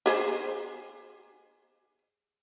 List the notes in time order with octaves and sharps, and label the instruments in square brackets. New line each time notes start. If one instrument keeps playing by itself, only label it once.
[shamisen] G4 G#4 C5